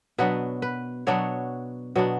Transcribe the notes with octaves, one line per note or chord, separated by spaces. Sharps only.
B2 F#3 B3 D4 B4
B4
B2 F#3 B3 D4 C#5
B2 F#3 B3 D4